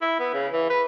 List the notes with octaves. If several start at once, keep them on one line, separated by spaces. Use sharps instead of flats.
E4
B3
C#3
E3
B4